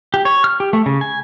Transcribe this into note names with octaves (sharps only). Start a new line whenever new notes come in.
G4
C#5
F6
G4
A3
C#3
G#5